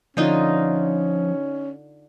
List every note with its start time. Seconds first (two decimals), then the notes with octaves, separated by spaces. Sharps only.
0.17 D3 F3 C#4 D#4 F4